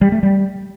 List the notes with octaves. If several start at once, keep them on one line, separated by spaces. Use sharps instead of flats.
G3
A3
G3